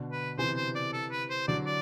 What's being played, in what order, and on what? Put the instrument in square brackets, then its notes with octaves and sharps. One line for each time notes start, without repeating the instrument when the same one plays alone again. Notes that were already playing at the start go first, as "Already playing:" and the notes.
Already playing: [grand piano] B2 D3
[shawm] B4
[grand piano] C3 E3 [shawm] C5
[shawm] C5
D5
A4
B4
C5
[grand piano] D3 F#3 [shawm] D5
[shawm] D5